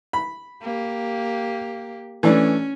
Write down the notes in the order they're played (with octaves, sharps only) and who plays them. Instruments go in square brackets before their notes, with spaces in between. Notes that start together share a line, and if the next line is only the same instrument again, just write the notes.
[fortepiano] B5
[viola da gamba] A#3 G4
[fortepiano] E3 A3 D4 [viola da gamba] C#4